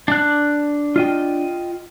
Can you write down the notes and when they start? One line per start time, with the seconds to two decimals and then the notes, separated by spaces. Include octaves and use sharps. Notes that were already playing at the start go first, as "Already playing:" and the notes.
0.08 D4 F#6
0.96 F4 D#5 G5